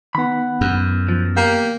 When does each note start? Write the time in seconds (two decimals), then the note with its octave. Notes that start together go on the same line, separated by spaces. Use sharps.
0.15 D#3 B3 F#5 B5
0.61 F#2
1.09 F3
1.37 A#3 G4